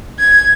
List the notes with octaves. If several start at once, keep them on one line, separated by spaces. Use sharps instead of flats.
G#6